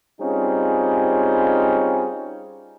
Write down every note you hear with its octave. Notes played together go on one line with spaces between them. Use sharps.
G3 C4 C#4 D#4 F4 G#4